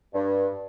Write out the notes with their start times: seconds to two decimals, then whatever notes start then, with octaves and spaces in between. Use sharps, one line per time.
0.14 G2